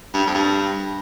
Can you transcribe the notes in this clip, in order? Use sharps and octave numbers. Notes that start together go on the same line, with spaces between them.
G2
F2
G2